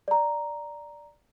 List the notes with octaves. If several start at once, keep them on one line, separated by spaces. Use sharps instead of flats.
D5 A#5